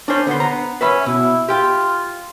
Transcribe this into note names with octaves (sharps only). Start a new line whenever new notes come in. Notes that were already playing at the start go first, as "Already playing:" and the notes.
C#4 D4 C5
D3 B3 C5
A#5
C#4 B4 E5 B5
B2 E4
F4 G4 G5